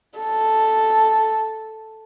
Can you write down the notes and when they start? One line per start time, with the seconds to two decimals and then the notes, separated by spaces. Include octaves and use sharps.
0.19 A4